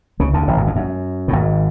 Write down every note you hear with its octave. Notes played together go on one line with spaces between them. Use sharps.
C#2 C#3
D2 D3
A1 A2
G#1 G#2
F2
F#2
A2
G#1 G#2